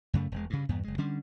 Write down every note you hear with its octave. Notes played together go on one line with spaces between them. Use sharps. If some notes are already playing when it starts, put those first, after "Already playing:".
F#2 C#3 A3
E1 G#3
G2 C#3
E2 G2 B3
F#1 G#3
D3 G3 C#4 D4